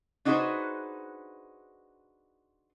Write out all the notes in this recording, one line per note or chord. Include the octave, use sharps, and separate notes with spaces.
D4 D#4 F#4 G#4 B4 C5